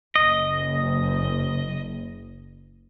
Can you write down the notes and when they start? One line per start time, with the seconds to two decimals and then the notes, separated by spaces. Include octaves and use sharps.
0.16 F#1 D#5